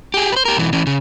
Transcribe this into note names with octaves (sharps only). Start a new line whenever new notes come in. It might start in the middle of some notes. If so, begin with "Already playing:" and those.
G4 G#4
B4 C5
G4 A#4
B1 E3
E3 C#4
C#3